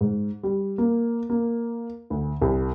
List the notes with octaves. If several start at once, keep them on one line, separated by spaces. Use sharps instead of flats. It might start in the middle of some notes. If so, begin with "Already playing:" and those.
G#2
G3
A#3
A#3
D2
C2